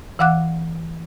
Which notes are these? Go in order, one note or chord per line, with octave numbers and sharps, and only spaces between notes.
E3 F5 F#5 D6 F#6